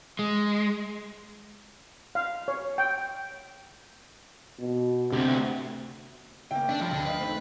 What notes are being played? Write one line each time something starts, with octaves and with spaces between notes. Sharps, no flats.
G#3
F5
C#5
G5
B2
D2 C3
C#3 A#3 E4 G5
A3 D4
G2 F3
D2 D3
B4 D#5 F5
D#3 A3 C4